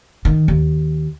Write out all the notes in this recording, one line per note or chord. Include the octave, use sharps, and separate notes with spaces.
D#3
D#2